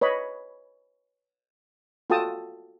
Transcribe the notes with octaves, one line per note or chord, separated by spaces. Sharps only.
B4 C#5 D#5 B5
F4 F#4 A4 G5 A5 D#6